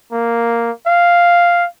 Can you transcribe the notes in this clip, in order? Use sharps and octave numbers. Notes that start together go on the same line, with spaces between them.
A#3
F5